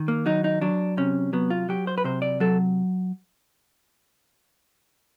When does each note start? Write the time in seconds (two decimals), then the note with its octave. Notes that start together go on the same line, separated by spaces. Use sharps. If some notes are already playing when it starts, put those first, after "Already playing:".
Already playing: D#3
0.08 A#3
0.26 F#3 D#4
0.44 D#4
0.61 F#3 D4
0.97 C3 C#4
1.33 F#3 B3
1.50 F4
1.69 F#3 G4
1.87 C5
1.98 B4
2.04 C3 C5
2.22 D5
2.40 F#3 A4